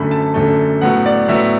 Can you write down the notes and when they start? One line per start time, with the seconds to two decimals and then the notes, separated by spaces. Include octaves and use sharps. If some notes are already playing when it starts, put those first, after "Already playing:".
Already playing: F#2 D3 A3 B5
0.11 A5
0.34 F#2 D3 A3
0.81 A2 F#3 B3 F#5
1.06 D5
1.28 A2 F#3 B3 E5